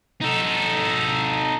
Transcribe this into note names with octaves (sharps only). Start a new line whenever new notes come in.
D#4 A4